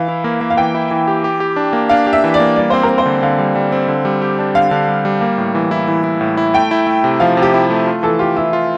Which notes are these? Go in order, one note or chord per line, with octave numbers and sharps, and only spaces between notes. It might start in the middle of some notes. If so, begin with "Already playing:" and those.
Already playing: E3 F5
E4
A#3
A#3
F5
E3 G5
E4
E3
G4
G4
G4
D4
A#3
D4 F5
G4
E5
E3
D5
A#3
G3 D5
C4 C5
A#4
C4
C5
D3
D3 F5
G3
G3
C4
D3
G3
G4
D4
D3 F5
D3
G3
G3
A#3
A2
E3
E4
E3
E4
A2
E4
A3 G5
E4
A3
C3
F3 F5
C3
G4
E4
A3
F4
E3 A4
F4 G4
E3 E4
F4